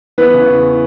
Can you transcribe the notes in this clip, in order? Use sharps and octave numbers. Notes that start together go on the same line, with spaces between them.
E3 B3 B4
C#3
E2